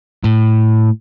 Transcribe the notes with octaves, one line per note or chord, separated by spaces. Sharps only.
A2